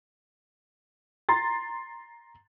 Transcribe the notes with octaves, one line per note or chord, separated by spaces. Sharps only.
A#5 C6 A6